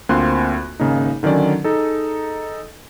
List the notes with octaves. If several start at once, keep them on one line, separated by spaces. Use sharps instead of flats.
D2 A#3 C4 F4 C6 F#6
G#1 C#3 A#3 D#4
D3 D#3 F#3 C#4 D5
D#4 G#4 A4